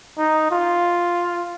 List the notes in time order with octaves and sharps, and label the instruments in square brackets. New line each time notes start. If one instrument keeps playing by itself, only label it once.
[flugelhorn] D#4
F4